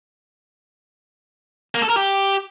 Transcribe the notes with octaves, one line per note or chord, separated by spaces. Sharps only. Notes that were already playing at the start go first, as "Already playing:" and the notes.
A#3
A4
A#4
G4